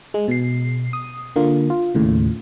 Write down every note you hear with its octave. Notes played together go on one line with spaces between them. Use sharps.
G#3
B2 C7
D#6
D3 A#3 F4
F4
D#2 A2 C#3